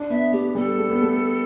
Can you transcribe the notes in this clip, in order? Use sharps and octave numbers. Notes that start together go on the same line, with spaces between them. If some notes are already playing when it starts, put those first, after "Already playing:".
Already playing: D4
B3 E5
A3 G4
G3 A4
A3
B3
A3